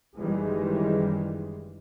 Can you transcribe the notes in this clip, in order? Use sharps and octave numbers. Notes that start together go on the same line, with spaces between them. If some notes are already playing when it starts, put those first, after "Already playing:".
F#1 D#3 E3 G3 G#3